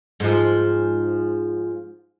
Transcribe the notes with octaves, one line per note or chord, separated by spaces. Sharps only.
G#2 F3